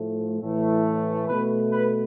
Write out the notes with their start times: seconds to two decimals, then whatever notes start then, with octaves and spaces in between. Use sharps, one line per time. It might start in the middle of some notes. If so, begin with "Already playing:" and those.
Already playing: A2 F3 A3
0.41 A2 E3 A3
1.28 B2 A3 B4
1.72 B4